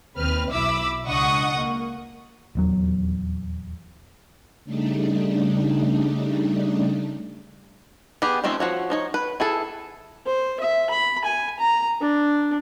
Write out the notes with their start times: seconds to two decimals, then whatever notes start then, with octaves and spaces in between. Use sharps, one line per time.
0.18 D#2 C4 B4 F6
0.52 B1 E4 E5 B5 D6 E6
1.06 C#2 D4 D#5 F#5 C#6 D#6
1.58 A#3
2.55 D#1 E2 F#3
4.65 C#3 G3 A3 D4 D#4
8.22 B3 G4 G#4
8.44 D#3 F3 A3 C4 C#4
8.60 F3 F#4 C#5
8.90 F3 D#4 C#5
9.14 B4
9.40 E4 G#4 A4
10.26 C5
10.60 E5
10.90 B5
11.24 G#5
11.59 A#5
12.01 D4